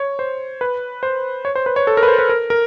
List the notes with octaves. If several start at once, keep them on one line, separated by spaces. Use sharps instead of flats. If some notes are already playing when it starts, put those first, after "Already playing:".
Already playing: C#5
C5
B4
C5
C#5
C5
B4
C#5
A4
A#4
B4
C5
B4
A#4
A#4